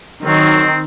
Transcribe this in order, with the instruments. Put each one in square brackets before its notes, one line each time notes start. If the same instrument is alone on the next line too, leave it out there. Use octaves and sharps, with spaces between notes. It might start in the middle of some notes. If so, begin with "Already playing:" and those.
[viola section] D#3 [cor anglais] F#3 [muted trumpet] C4